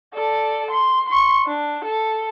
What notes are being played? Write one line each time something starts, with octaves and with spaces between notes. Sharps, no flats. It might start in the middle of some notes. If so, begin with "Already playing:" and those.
A4 D5
C6
C6 C#6
D4
A4